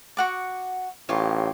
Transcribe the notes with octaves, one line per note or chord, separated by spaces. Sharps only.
F#4 F#5 D6
A1 F4 G4 C#5